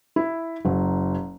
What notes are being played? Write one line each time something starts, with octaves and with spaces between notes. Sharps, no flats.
E4
F#1 F#3